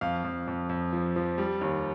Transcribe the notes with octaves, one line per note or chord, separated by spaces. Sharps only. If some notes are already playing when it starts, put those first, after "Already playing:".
F2 F5
F2
F2
F2
F3
F3
G3
D#2